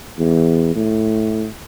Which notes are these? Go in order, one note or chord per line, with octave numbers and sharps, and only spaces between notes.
E2
A2